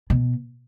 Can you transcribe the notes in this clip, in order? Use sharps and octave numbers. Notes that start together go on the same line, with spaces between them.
B2